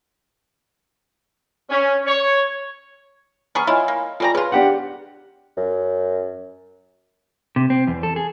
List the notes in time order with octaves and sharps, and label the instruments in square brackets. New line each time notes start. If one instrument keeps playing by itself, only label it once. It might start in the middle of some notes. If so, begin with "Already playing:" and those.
[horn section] C#4
C#5
[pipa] B3 G#4 C#6 [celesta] A#5 F6
[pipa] E4 F4 [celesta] C#5 D#5 G#5
[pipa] A#3
[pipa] B2 G3 A#5 [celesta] F4 A4 G#5
[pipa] C#4 F4 [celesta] G#4 [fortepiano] B4
[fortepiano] D4 G4 F#5
[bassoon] F#2
[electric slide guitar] C3
C4
E2
A4
G#4